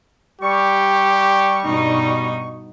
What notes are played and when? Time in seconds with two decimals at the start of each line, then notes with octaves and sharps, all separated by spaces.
0.42 G3 G4 C#6
1.63 G2 B2 D#4